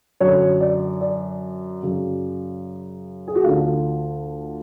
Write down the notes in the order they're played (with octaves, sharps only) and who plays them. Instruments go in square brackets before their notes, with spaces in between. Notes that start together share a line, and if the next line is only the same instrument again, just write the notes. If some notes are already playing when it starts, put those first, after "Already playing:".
[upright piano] F#2 D3 C#5
D5
D5
F#2 C#3
G#4
F#4
D2 D3 F4